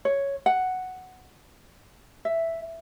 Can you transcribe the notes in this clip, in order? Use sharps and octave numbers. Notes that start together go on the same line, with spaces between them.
C#5
F#5
E5